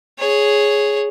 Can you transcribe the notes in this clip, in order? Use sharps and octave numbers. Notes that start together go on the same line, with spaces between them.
G#4 C#5